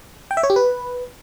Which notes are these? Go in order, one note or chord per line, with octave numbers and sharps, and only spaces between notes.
G5
E5
C#5
G4
B4